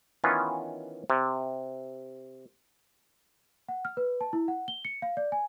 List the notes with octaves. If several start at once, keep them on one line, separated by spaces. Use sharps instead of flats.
D#3 E3 B3 C#4 F4
C3
F#5
F6
B4
A5
E4
F#5
G7
C#7
F5
D5
G#5